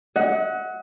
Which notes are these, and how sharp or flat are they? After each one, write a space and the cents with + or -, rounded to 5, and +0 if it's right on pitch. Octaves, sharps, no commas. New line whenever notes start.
D#5 +45 F#5 +0